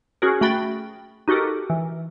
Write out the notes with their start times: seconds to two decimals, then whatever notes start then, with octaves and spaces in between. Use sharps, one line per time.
0.22 C#4 F#4 G#4 A#4
0.41 A3 F#4 G5 B5 A6
1.28 D#4 F#4 G4 A4 A#4
1.70 E3